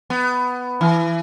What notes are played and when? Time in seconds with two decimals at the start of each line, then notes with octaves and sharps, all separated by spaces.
0.10 B3
0.81 E3